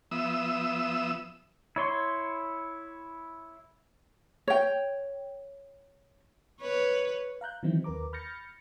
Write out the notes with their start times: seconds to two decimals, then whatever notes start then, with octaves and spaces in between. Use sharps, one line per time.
0.11 F3 B3 E5 D#6 E6
1.76 E4 C#5 C6
4.48 C#5 G5
6.61 B4 C#5
7.41 F5 A#5 F#6 G6
7.63 D#3 E3 F#3 C4 D#4 E4
7.84 D#2 A#4 B4 A#5 D6
8.13 B5 F6 G6 A6 A#6 C#7